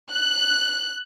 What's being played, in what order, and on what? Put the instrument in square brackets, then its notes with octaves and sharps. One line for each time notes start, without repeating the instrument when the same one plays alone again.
[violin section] F#6